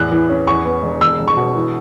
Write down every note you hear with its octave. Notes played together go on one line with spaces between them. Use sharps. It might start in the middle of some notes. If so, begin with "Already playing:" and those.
Already playing: E2 A2 F#6
E3
C#4
E2 C#6
B3
E1
E1 E6
E1
C#6
B2
E3